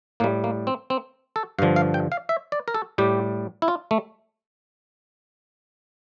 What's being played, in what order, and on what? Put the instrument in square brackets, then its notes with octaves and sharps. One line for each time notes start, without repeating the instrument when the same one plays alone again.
[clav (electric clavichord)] A2 G3 A#3
A#3
C4
C4
A4
G2 D3 F3 F5
F5
G5
F5
E5
D5
A#4
A4
A2 G3 G4
E4
F4
A3